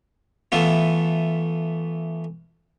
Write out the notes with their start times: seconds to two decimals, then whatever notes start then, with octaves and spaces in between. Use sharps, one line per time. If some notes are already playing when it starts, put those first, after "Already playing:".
0.52 E3 A3 B3 F4